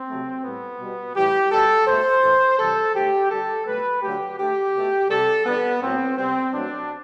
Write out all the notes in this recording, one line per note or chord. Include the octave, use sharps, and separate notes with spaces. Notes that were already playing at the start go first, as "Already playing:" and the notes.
Already playing: C4
C3 F#3 A3
A2 G3 B3
B2 G3
A2 E3 G3 G4
B2 G3 A4
B2 A3 C5
A2 E3 A3
C3 E3 G3 A4
D3 A3 G4
D3 G3 A4
B2 F#3 A3 B4
D3 F#3 A3 G4
D3 A3 G4
B2 A3
C3 G3 A4
D3 G3 B3
A2 F#3 A3 C4
C3 G3 C4
B2 F#3 A3 D4